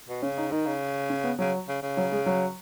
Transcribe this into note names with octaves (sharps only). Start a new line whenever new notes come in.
B2
C#3 C#4
D#4
D#3 D#4
C#3
C#4
B3
C#3 F#3
C#3
C#3
F#3
G#3
F#3